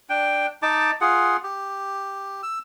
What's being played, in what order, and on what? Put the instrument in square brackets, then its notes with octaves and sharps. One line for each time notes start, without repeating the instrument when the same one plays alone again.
[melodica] D4 G5
D#4 A5 D6
F4 G#4 F#5
G4
E6